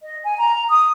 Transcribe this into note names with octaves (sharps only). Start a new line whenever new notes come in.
D#5
G#5
A#5
D#6